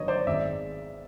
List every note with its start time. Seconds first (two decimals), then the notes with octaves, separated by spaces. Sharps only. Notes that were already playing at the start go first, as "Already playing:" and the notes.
Already playing: G1 G2 D#3 F#3 B3 C#5 D#5
0.08 C5 D5
0.26 G#1 G#2 D#3 G#3 D5 E5